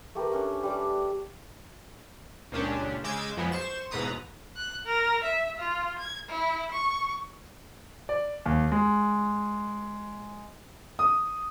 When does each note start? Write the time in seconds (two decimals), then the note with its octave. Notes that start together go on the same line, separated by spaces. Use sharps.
0.15 A3 G4 A#4 B4
0.32 A3 C#4 D4
0.63 G3 D5 D6
2.52 C#2 A#2 C#4 D4 G4
3.04 C#3 G#3 D6 E6 G6 G#6
3.37 F2 F3 F#3 G#3 B3
3.52 C5 C#6 E7
3.91 E2 G#2 B2 B4 A#5 D#6
4.57 F#6
4.86 A#4
5.24 E5
5.59 F4
5.99 G#6
6.29 E4
6.72 C#6
8.09 D5
8.46 D#2
8.72 G#3
10.99 D#6